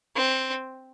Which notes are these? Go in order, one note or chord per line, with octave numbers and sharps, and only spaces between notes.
C4